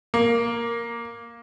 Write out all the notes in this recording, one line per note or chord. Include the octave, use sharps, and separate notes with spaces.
A#3